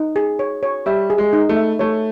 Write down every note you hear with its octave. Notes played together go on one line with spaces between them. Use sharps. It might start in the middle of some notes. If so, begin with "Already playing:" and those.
Already playing: D#4
G#4
C#5
C#5
G3 E5
G#4
G#3
D#4
A3
E5
A3 C#5